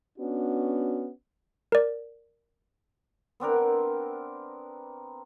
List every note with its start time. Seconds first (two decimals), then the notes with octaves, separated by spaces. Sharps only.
0.19 B3 C#4 D4 F#4
1.72 A#4 D5
3.40 B3 C4 D4 A#4